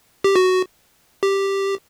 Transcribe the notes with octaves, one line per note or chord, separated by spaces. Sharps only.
G4
F#4
G4